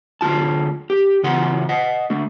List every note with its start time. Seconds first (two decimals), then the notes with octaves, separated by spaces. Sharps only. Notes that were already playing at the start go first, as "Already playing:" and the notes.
0.21 D2 F3 F4 A5
0.90 G4
1.24 C#3 E3 F4 F#5 C6
1.69 D#5 F#5
2.10 D3 A3